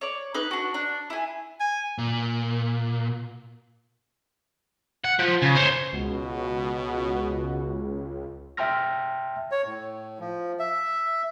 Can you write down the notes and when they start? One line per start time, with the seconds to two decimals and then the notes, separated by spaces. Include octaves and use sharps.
0.01 C#5 D5
0.34 D#4 B4
0.51 D4 F#4
0.74 D4
1.10 E4 G#5
1.60 G#5
1.98 A#2
5.05 F#5
5.19 F3
5.42 C#3
5.55 C5 C#5
5.93 C#2 B2 F#4
8.57 E5 G5 A5 C6 F6 A#6
9.52 C#5
9.66 A2
10.20 F3
10.59 E5